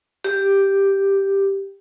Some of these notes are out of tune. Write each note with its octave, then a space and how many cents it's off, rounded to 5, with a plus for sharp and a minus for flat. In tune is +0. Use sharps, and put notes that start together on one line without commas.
G4 +0